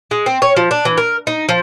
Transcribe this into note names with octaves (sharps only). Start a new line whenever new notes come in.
G#3
C4
C#5
F3
D4
E3
A#4
D#4
F3